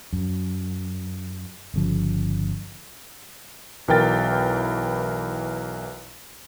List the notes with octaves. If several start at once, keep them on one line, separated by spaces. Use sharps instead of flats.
F#2
G1 C#3 F3
B1 E3 A#4 G5 A6